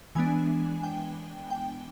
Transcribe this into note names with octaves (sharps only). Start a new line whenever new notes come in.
E3 G#3 B3 D4 G#5
G5
G5